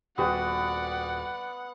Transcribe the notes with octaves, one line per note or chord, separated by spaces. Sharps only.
D#1 B3 F#4 D5 F#5 G5